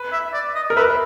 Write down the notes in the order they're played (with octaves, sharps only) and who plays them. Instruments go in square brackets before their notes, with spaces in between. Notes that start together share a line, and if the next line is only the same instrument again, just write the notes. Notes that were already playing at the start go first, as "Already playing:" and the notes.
Already playing: [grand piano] B4
[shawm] E5
D5
D#5
[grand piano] A#4
[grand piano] B4 [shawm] E5